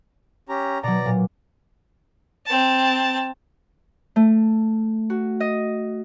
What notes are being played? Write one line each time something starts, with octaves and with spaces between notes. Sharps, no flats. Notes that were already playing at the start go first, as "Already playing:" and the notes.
C#4 G4 A#5
B2 F#3 D5 A#5
A#2
C4 A5
A3
F#4
D#5